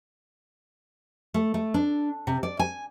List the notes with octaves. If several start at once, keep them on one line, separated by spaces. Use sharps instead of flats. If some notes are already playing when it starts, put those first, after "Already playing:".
A3
A3
D4
C3
D5
G#5